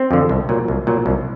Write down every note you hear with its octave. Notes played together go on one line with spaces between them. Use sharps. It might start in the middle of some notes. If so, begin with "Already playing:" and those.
Already playing: C4
F2 D3
C2
A#2 F#3
C2
A#2 F#3
C2